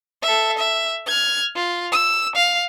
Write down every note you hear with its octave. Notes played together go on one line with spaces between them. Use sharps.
A4 E5
E5
F6 G#6
F4
E6
F5